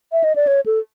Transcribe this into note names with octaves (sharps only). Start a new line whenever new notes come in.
E5
D#5
D5
C#5
A4